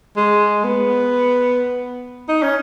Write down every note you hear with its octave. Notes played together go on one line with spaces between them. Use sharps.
G#3
B3
D#4
C#4